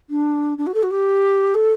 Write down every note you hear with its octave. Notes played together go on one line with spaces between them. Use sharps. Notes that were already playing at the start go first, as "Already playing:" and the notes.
D4
D4
F#4
A4
F#4
G4
A4